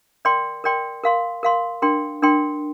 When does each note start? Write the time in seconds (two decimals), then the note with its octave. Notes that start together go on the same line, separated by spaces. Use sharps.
0.25 A#4 D5 G5 C6
0.64 A#4 D5 G5 C6
1.04 A#4 F5 C6
1.43 A#4 F5 C6
1.82 D4 A#4 G5 C6
2.22 D4 A#4 G5 C6